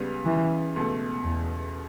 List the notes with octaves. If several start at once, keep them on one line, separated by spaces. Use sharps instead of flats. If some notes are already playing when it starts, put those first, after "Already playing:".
Already playing: C#2 C#3 G3 B3
E3
C#2 B2 A3
E2